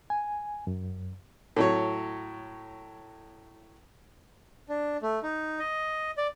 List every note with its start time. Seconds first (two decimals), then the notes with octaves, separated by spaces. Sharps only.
0.10 G#5
0.67 F#2
1.56 A2 F#3 C#5
4.69 D4
5.02 A3
5.23 D#4
5.59 D#5
6.18 D5